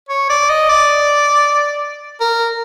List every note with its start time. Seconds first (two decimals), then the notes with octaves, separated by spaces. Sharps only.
0.09 C#5
0.30 D5
0.50 D#5
0.69 D5
2.21 A#4